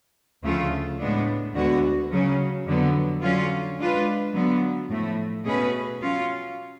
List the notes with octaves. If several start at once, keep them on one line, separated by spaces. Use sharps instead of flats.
D2 C#3 F3 A3 F4
A2 G#3 B3 D4
D2 D3 G#3 B3 F#4
C#3 F#3 C#4
F2 D3 F#3 B3
D3 F#3 C#4 F4
G#3 D4 F4 B4
D3 F#3 B3
A2 F3 A3
B2 A3 C#4 G#4 B4
F#3 C#4 F4